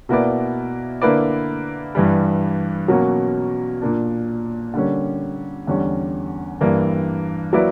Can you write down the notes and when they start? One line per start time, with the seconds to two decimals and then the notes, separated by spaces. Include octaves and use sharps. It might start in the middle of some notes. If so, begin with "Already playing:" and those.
0.09 B2 A#3 E4 B4 D5
1.02 D3 A#3 E4 B4 D5
1.95 G2 E3 G3
2.88 B2 F#3 A#3 C#4
3.81 A#2 A#3 D4
4.74 D3 G3 A#3 C#4
5.67 E2 D3 G3 C#4
6.61 G2 E3 G3 A#3 D4
7.53 F#3 A#3 E4 B4 D5